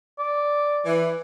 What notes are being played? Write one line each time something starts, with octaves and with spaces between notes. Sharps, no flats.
D5
E3